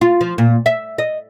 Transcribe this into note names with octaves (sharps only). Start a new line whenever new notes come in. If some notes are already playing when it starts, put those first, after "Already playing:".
F4
F3
A#2
E5
D#5